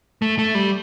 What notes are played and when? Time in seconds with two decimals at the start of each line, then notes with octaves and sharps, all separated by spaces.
0.22 A3
0.39 A3
0.55 G3